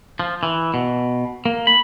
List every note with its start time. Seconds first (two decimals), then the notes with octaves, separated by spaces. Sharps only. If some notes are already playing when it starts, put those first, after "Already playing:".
0.19 F3
0.43 E3
0.74 B2
1.46 A#3
1.67 B5